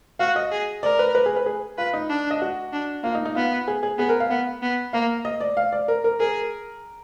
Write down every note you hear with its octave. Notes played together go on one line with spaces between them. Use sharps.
F#4 F5
D#5
G#4
A#4 D5
B4
B4
G#4
B4
G#4
F4 B4
D#4
D4
D#5
F#4
D4
A#3 F4
D#4
D#4
B3 F4
G#4
G#4
B3 G#4
A#4
F5
B3 F#5
B3
A#3 F5
D#5
D5
F5
D5
A#4
A#4
G#4 A#4